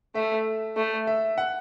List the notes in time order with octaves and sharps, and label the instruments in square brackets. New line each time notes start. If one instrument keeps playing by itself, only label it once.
[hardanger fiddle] A3 [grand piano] E5
[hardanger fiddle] A3
[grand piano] E5
F#5